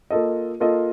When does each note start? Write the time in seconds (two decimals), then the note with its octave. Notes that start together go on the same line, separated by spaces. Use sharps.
0.10 A#3 F4 A4 D#5
0.60 A#3 F4 A4 D#5